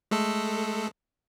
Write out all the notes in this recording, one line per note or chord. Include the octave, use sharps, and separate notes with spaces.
G#3 A3 A4